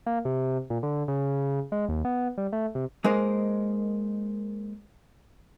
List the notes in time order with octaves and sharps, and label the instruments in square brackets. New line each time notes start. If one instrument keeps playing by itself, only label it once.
[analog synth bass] A#3
C3
A#2
D3
C#3
G#3
D#2
B3
G3
A3
C3
[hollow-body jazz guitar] G#3 A#3 D#4 A#4 C5